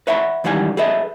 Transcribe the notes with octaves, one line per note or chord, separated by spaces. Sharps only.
B4 C#5 E5 F#5 G5 B5
C#2 D#3 E3 G3 F#5 G#5
G#4 A4 B4 D#5 E5